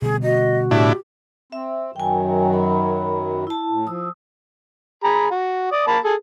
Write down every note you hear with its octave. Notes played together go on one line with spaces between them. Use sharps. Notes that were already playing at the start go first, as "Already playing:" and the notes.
B2 D3 G3 G#4
F#4 D#5
A2 D4 E4 G4
C4 E5
F#2 D#3 F#3 G5 G#5
B5
E4 A5
A2
F3 D#6 E6
G#4 A#5 B5
F#4
D5 D#6
A#3 A5 B5
G#4 A4